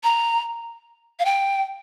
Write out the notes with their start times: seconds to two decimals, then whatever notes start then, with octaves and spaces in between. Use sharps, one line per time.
0.04 A#5
1.19 F5
1.25 G5